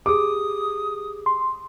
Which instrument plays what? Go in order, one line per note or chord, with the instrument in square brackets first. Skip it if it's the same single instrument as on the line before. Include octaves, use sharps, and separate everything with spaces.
[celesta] G4 G#4 [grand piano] D6 [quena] D#6
[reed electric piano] C6